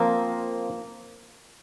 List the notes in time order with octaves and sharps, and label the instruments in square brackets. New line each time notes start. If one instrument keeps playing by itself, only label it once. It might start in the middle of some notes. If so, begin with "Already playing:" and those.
Already playing: [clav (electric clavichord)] F3 C4 F4 A#4 [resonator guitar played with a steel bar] A#3